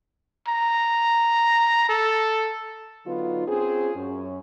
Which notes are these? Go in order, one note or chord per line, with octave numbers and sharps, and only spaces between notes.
A#5
A4
D3 F#3 B3 D#4 F4
C4 C#4 F4 G#4
F#2 C#4